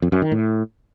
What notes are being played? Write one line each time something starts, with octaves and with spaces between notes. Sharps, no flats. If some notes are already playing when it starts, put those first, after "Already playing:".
F2
F#2
D#3
A2